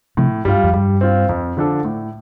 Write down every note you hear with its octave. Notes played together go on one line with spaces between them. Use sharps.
A2 C3 F3
G2 G3 F4
F2
G2 G3
C4 F4
F2
D3 F3 D4 A4
A2